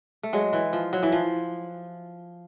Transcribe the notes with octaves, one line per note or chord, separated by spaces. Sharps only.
A3
F#3 G#3
E3
F3
F#3
E3
F3